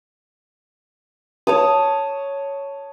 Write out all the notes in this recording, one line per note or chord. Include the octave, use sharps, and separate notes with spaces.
C#5 A5 D#6